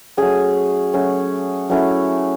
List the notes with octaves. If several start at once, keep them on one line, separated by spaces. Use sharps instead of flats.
F#3 A3 C#4 G#4
F#3 A3 C#4
F#3 A3 C#4 E4